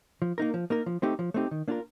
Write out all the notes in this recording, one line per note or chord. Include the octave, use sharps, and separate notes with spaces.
F3
A#3 D#4 A#4
F3
A#3 D#4 A#4
F3
A3 C4 D#4 G4
F3
A3 C4 D#4 G4
D#3
A#3 D4 F4 A#4